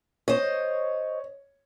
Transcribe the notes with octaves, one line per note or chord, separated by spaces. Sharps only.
C5 C#5 D#5